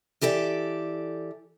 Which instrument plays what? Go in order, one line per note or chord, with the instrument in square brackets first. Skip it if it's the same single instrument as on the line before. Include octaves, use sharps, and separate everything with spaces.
[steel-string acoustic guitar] E3 G4 A4 D5